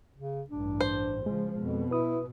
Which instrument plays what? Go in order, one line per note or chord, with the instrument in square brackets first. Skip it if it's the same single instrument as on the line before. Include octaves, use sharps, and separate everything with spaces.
[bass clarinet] C#3
[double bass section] A1 G2 [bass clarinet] D4
[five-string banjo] C5
[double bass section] C#3 F3 [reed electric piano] G#3
[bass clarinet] F2 [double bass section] B2
[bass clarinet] E4 [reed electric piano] B4 D#6